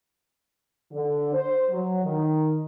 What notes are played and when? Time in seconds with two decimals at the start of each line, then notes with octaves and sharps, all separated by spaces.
0.92 D3
1.32 C5
1.71 F#3
2.03 D#3